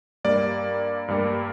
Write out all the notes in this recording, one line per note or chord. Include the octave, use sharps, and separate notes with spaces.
G2 G3 A#3 D5
G2 G3 A#3